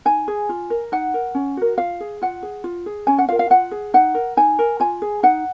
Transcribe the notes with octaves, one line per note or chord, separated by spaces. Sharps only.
D#4 G#5
G#4
F4
A#4
D#4 F#5
A#4
C#4
F#4 A#4
F4 F5
G#4
F4 F#5
G#4
F4
G#4
C#4 G#5
F#5
F4 A#4 F5
F5
F4 F#5
G#4
D#4 F#5
A#4
D#4 G#5
A#4
F4 G#5
G#4
D#4 F#5